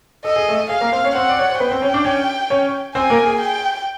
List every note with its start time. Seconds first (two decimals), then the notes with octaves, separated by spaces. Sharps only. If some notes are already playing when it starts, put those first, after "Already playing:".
0.25 A4 D#5
0.36 G#4
0.49 A3 A4
0.69 G#4 F5
0.81 A#3 A#4
0.92 C4 C5
1.04 C#4 C#5
1.15 C4 C5 F#5
1.29 D5
1.39 C#5
1.50 C5
1.60 B3 B4 G5
1.71 C4 C5
1.82 C#4 C#5
1.94 D4 D5
2.05 C#4 C#5
2.50 C#4 C#5
2.95 C4 C5 G#5
3.10 A#3 A#4
3.26 G#4
3.40 G5